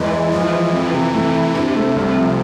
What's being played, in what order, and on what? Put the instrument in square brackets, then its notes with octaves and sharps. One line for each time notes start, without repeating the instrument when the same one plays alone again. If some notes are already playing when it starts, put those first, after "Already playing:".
Already playing: [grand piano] E2 G#3 [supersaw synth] E3
[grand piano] G#3
[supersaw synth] E3 [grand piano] F3
[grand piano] F3
F2
C3
A3
E4
[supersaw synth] C3 [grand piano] D4
[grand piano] A3
C2
F3